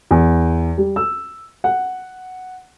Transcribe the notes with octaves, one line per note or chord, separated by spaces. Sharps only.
E2
G3
E6
F#5